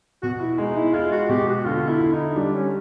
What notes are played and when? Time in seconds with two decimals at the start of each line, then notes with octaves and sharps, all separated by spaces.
0.22 B2 F#4
0.41 E4
0.58 G#3 D#4
0.76 E4
0.93 G#3 F4
1.12 F#4
1.29 B2 G4
1.47 F#4
1.65 D3 F4
1.88 E4
2.00 D3
2.13 D#4
2.36 G3 D4
2.55 C#4